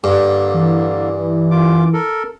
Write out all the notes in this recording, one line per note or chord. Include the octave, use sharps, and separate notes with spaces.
G2 D3 A#3
E3
F#2 F4 D6
A4 A#4